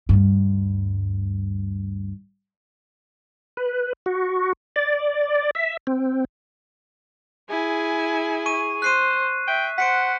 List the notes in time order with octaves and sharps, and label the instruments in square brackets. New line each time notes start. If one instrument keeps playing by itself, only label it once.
[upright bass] D2 G2
[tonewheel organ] B4
F#4
D5
E5
C4
[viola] E4 G#5 [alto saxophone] G#4
[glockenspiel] C#6 D#7
[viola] C5 [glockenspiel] F#6 C7 D#7
[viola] E5 [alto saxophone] G5
[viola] C5 [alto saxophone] F#5 [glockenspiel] B6 C#7 D7